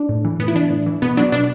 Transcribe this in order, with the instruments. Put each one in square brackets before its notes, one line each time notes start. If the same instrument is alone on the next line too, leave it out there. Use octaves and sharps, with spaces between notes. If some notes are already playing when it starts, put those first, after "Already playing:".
Already playing: [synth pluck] D4
A2
E3
A2 B3
E4
E3 D4
A2
E3
B2 B3
F#3 D4
B2 D4